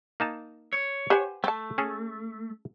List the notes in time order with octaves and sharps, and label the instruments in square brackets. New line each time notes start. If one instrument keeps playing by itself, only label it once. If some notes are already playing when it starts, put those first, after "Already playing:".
[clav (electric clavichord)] A#3 D#4 A5
[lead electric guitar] C#5
[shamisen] G4 G#5 [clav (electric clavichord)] B4 C5 F#5
[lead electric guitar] A3 [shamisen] C4 A5
[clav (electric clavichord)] C#4 G#4 A4